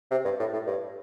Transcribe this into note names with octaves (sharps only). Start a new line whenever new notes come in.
C3
G2
A2
A2
G2